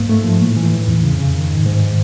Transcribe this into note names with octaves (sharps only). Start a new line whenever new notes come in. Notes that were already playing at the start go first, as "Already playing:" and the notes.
Already playing: G#2 A#3
A3
F3
A2
E3
A2
F2
C#3
C#3
D#3
G#2
G#2